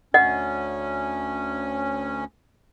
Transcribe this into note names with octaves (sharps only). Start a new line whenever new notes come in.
D2 C#4 D#5 F#5